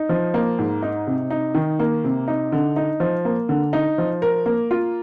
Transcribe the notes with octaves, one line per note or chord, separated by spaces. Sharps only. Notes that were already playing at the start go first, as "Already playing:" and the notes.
Already playing: D#4
F3
A#3
G#2
D#4
C3
D#4
D#3
A#3
C3
D#4
D3
D#4
F3
A#3
D3
D#4
F3
A#4
A#3
F4